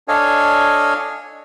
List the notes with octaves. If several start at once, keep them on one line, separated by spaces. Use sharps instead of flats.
D4 A4 C#5 D#5 F5 G#5